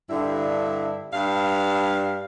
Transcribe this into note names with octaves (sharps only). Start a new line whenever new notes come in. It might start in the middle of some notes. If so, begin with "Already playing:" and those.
G2 D3 E4
G2 F5